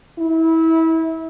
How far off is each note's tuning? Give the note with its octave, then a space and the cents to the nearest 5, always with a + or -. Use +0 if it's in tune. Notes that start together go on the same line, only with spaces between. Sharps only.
E4 -25